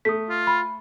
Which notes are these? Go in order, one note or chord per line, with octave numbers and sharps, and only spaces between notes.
A3 D#6 B6
F4
B5